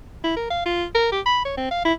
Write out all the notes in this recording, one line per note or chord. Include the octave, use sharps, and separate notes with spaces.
E4
A#4
F5
F4
A#4
G4
B5
C#5
C4
F5
E4